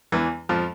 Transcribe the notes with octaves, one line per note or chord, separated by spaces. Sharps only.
E2 E3
F2 F3